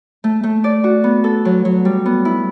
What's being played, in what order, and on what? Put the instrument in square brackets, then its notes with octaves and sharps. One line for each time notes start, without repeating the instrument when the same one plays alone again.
[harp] A3
A3
D5
F#4
B3
A4
F#3
F#3
G3
B3
E4